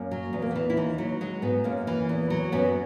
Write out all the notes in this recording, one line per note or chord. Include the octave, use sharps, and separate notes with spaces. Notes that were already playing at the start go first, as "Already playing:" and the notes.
Already playing: F#2 A#3
F#3
E2 B3
A#3
E3 B3
E4
D#2 D#4
F#3
F#3 G#3
G#2 B3
F#2 A#3
E3
E2
F#3
F#2 B3